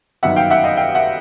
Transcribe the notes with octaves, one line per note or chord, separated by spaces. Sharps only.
G1 F#2 D#3 E5 F#5
F5 G5
E5 F#5
D#5 F5
F5 G5
E5 F#5